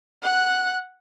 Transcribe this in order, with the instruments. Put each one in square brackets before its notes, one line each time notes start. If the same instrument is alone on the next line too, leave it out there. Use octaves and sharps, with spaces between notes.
[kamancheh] F#5 F#6